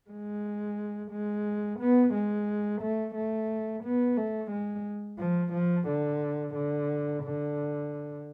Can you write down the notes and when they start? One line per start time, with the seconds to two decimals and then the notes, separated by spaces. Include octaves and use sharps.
0.10 G#3
1.11 G#3
1.79 B3
2.14 G#3
2.82 A3
3.15 A3
3.84 B3
4.17 A3
4.51 G#3
5.19 F3
5.53 F3
5.88 D3
6.55 D3
7.24 D3